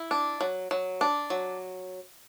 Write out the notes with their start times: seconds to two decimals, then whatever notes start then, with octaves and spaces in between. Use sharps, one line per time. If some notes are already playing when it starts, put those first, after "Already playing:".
Already playing: E4
0.11 D4
0.41 F#3
0.71 F#3
1.01 D4
1.30 F#3